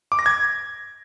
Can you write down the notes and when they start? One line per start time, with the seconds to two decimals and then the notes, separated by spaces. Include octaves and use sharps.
0.12 D6
0.19 A#6
0.26 G#6